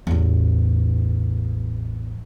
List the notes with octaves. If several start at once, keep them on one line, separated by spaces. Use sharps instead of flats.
A1 E2